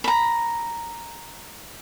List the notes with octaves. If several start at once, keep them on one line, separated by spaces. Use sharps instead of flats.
A#5 B5